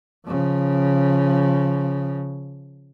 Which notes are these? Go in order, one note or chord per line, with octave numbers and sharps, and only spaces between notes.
C#3 F3